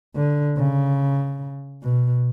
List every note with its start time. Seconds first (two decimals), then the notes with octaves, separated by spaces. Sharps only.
0.16 D3
0.57 C#3
1.83 B2